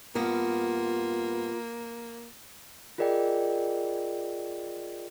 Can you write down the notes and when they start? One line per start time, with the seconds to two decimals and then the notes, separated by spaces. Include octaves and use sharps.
0.15 G2 A#3 B3 F4
2.98 F4 G#4 A#4 D5 D#5 G5